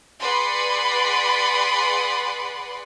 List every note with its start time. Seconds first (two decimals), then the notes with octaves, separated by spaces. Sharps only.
0.20 G#4 B4 D5 F#5 B5 C6